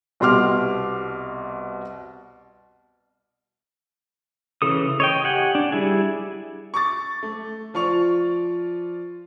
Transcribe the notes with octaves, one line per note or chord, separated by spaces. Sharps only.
C2 B2 C6 D6 F6
C#3 E3 A4 D#6
C#5 D#5 G5
G4 F#5 G#5
D4
G3 E4 G#4
C#6 D6 A6
A3
F3 F4 D5 C#6 F7